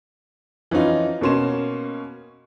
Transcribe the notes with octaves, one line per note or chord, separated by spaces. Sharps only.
E3 F3 C#4 D#4 F4
B2 A#3 C#4 C6 E7